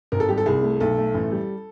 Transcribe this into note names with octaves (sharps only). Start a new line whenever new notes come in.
G#1 A#4
A4
G3 G4
A4
C2 G#4
A3
B1 A4
A3
A1
G3